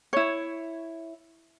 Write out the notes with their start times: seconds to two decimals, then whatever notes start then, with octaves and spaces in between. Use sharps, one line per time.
0.13 E4 C#5